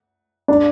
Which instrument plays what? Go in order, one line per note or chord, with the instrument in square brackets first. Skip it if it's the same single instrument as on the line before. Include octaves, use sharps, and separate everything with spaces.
[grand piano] D4